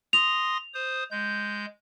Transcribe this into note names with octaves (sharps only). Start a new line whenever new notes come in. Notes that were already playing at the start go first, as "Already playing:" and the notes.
C6 D#6 A#6 F7
C5 D#6
G#3 G6